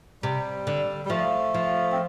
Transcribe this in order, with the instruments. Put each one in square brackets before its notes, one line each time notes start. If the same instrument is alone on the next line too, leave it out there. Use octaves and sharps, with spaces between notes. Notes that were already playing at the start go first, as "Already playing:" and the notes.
[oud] C3 [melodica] G3
[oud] D3
[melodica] G3
[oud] F3 [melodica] A3
[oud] F3
[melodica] C4